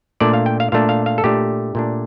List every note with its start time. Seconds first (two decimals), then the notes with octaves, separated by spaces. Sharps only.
0.20 A#2 A3 D4 D5
0.33 F5
0.46 G5
0.60 F5
0.72 A#2 A3 D4 F5
0.89 F5
1.06 F5
1.18 A4
1.24 A#2 A3 D4 G4
1.75 A#2 A3 D4